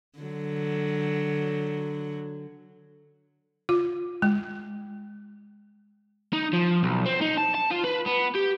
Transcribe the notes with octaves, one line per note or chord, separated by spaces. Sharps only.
D3 F#3
F4
G#3
D#4
F3
B1
C4
D#4
A5
A5
F4
B4
B3
G4